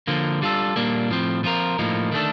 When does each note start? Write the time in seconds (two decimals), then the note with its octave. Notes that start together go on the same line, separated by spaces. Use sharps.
0.08 D3 F3 A#3
0.42 G3 D4 F4 A4
0.76 A#2 G3 A#3 D4
1.10 A2 F3 C4
1.44 F3 C4 F4 A#4
1.79 A2 F3 A#3 D#4
2.12 D#3 A3 D4 A4